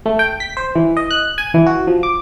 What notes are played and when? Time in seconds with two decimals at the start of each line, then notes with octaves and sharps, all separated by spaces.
0.06 A3
0.19 G5
0.40 B6
0.57 C5
0.75 E3
0.97 D#5
1.11 F#6
1.38 G#5
1.54 E3
1.66 F#4
1.87 F3
2.03 D6